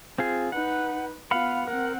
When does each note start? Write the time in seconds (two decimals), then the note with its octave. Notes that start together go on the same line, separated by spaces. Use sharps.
0.18 C4 F4 G#4
0.52 D#4 B4 F#5
1.31 B3 F4 F5 F#5 B5
1.67 C4 A#4 F#5